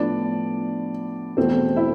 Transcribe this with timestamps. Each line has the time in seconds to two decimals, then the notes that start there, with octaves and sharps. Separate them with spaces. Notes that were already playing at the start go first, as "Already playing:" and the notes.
Already playing: A2 F3 B3 D4 D5
1.37 E2 B2 A3 C4 C5
1.76 E4 E5